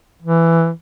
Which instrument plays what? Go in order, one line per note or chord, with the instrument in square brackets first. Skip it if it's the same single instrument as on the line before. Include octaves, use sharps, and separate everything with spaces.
[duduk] E3